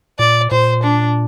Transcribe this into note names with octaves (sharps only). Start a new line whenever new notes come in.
A#2 D5
A#2 C5
D4